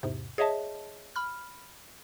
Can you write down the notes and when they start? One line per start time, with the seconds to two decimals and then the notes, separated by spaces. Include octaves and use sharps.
0.03 E2 G#2 C3
0.38 G#4 C#5 D#5 E5 A5
1.16 B5 F6